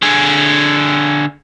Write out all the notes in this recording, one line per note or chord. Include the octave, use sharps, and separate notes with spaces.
D3 G#4